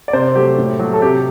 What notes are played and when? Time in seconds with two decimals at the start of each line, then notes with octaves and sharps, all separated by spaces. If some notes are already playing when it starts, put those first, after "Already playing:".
0.08 D5
0.13 C3 C5
0.35 F#3 A3 G4
0.58 A2
0.79 F#3 A3
0.93 A4
1.02 C3 G4